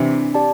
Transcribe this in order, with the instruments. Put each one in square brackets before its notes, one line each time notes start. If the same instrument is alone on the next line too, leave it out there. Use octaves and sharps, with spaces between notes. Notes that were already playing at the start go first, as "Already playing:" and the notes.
Already playing: [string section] C3 E3 [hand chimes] D4
[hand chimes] G4 D5 A5